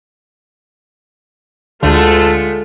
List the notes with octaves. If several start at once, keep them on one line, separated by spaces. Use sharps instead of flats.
D2 D3 G#3 A3 F4 A4